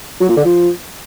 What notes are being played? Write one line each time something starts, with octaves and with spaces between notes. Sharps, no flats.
F#3
A#2
D3
F3